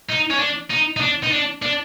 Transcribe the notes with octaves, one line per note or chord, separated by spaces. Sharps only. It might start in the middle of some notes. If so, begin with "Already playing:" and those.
D#4
C#4
D4
D#4
D#4
D4
D#4
D4
D4